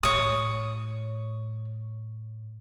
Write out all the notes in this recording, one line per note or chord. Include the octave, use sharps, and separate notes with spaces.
A2 C#5 D#6